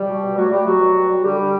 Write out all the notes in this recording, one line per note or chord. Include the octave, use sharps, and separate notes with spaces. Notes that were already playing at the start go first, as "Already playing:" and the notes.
Already playing: G3 G4
B2
B2
F#3 A3 F#4
G3 A3 G4
B2 F#3 F#4
B2
G3
G3
D3 G3 G4
D3